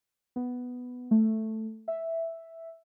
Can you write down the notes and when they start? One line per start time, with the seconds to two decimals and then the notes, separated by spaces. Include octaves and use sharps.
0.36 B3
1.11 A3
1.88 E5